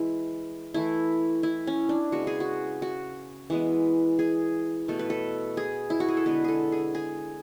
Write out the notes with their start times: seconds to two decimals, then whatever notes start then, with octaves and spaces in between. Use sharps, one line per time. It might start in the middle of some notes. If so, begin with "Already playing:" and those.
Already playing: E3 G#3 E4
0.74 E3 A3 E4
1.43 E4
1.67 C#4
1.89 D4
2.12 C#3 G#3 B3 F#4
2.27 G#4
2.40 F#4
2.82 F#4
3.50 E3 G#3 B3
4.19 G#4
4.88 B2 A3 A4
4.99 B4
5.10 A4
5.57 G#4
5.90 E4
6.00 F#4
6.08 G#4
6.17 A4
6.26 D3 G#3 B3 B4
6.44 G#4 A4
6.72 G#4
6.95 G#4